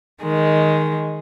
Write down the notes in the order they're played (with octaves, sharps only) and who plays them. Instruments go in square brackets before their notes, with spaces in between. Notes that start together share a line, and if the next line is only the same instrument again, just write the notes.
[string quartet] D#3 G#3